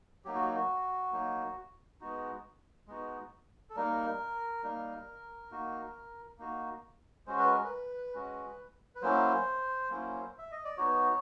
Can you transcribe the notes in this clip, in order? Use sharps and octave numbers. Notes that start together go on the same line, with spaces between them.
F#3 A#3 D#4 G4
F#4
F#4
F#3 A#3 D#4
G#3 B3 D#4 F#4
G#3 B3 D#4 F#4
A4
G3 A#3 D#4 A#4
G3 A#3 D#4
A#3 D#4 F#4
A#3 D#4 F#4
G#3 C#4 F#4 C5
B4
A#4
B4
G#3 C#4 F#4
B4
F#3 A#3 C#4 E4 C5
F#3 A#3 C#4 E4
E5
D#5
D5
B3 D#4 F#4 C#5